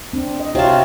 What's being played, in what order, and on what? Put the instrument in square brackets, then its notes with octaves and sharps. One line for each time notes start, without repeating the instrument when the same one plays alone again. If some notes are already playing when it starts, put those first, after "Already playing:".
[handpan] C4 D4
D#5
[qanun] C3 F#4 A5 [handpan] F4 C#5 F5